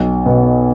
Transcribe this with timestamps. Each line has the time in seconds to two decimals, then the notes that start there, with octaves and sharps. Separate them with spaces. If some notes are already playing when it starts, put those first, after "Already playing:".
Already playing: B1
0.26 B2 B3